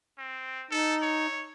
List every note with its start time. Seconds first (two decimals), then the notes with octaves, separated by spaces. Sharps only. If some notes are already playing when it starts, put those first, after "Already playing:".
0.18 C4
0.71 D#4 A4
1.02 C#5